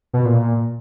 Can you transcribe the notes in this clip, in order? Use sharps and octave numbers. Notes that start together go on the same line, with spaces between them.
B2
A#2